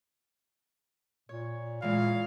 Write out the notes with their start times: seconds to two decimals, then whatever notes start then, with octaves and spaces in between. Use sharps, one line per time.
1.29 A#2 C#5
1.82 A#2 E3 G#3 C#5 F5